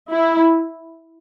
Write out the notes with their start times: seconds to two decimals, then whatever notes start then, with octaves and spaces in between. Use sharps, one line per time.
0.11 E4